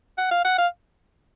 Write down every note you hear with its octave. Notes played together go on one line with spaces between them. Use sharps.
F#5
F5
F#5
F5